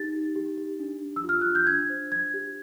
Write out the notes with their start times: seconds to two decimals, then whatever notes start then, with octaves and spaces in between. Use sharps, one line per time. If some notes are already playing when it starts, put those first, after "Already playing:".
Already playing: D#4 G4 A6
0.15 G4
0.35 G4
0.58 G4
0.79 D4
1.02 D4
1.16 E6
1.24 F4
1.29 F6
1.41 D4 F#6
1.55 G6
1.67 D4 G#6
1.89 C5
2.11 D4 G#6
2.34 G4